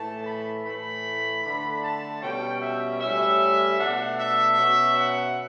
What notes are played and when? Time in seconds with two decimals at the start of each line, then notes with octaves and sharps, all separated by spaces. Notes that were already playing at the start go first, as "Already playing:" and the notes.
Already playing: A2 E3 A3 A5
0.25 B5
0.64 A2 E3 A3 B5
1.43 D3 A3 D4 B5
1.83 A5
2.21 B2 G3 C#4 G5
2.61 E5
3.00 A2 G3 C#4 E5
3.79 B2 A3 D4 F#5
4.18 E5
4.57 B2 F#3 C#4
4.96 F#5